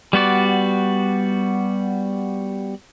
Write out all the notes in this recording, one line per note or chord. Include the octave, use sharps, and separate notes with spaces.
G3 B3 F#4 D5